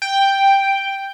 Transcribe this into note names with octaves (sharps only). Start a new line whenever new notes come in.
G5